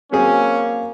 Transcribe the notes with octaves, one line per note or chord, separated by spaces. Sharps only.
F#3 A#3 C4 C#4 G#4